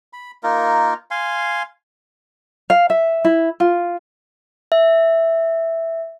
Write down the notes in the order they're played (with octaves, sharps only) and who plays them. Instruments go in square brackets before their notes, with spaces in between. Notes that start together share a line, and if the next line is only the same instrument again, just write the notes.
[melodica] B5
A#3 D#4 F4 A#4
F5 G#5 C6
[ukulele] F5
E5
E4
F4
[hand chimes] E5